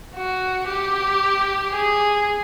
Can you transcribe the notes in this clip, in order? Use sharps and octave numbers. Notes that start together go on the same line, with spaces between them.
F#4
G4
G#4